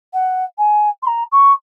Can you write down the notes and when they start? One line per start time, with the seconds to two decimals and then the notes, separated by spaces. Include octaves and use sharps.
0.13 F#5
0.58 G#5
1.03 C6
1.07 A#5
1.32 C#6